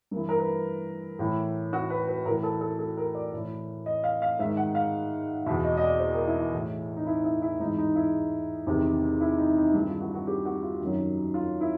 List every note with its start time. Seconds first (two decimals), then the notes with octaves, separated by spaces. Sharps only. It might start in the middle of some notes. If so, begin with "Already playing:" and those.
0.11 G2 A#4
0.16 E3
0.29 A#4
0.39 B4
1.19 A2 E3
1.73 F#4
1.90 B4
2.08 B4
2.26 A2 E3 A#4
2.43 A4
2.61 A4
2.79 A4
2.97 A#4
3.15 D5
3.33 A2 E3
3.86 D#5
4.04 F5
4.22 F5
4.39 G#2 E5
4.43 D#3
4.57 F#5
4.75 F5
5.46 E2 B2 E5
5.64 D#5
5.77 D#5
5.82 D5
6.00 C5
6.13 A#4
6.27 E4
6.40 E4
6.53 A2 E3
6.97 D#4
7.06 E4
7.24 E4
7.42 E4
7.60 G#2 D#4
7.64 E3
7.78 D#4
7.96 E4
8.67 E2 C3 D#3
9.20 E4
9.38 D#4
9.56 D#4
9.74 G2 D#3 E4
9.87 F4
10.01 F#4
10.14 F#4
10.27 G4
10.45 F#4
10.63 F4
10.81 F#2 D#3
11.34 F4
11.61 E4